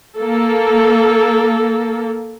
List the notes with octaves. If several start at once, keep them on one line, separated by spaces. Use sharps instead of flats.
A#3 A4